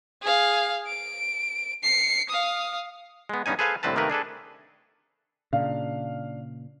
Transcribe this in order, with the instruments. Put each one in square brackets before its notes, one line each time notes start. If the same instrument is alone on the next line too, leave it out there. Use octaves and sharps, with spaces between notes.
[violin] G#4 F5
D7
C7 C#7
F5 D#6
[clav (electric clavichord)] G#3 B3
G2 B3 C#4 D#4 G#5
G#4 A4 B4 C5 F5 G#5
C2 A2 D3 C4 B4 A5
C3 D#3 A3 A#3 A#4 B4
D4 G#4 A4 B4
[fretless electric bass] A#2 C#3 [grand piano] D4 F5